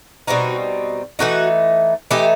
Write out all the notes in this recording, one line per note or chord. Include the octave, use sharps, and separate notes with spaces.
B2 G3 C4 D#4 F#4
E3 A3 D#4 F#4
E3 A3 D#4 G4